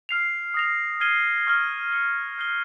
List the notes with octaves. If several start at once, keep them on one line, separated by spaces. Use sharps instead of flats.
F6 C7 F7
D#6 A#6 F7
F6 G#6 C7 D#7 G7
C#6 F6 C7 G7
D#6 G6 C#7 G7
D#6 G6 C7 G7